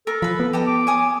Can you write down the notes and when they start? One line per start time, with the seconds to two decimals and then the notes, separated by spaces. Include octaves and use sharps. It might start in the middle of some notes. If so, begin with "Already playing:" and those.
0.07 A4 A#4
0.22 F3 B4 B5
0.40 B3
0.53 G4 A4 D#5
0.67 D6
0.87 C#5 G#5 D#6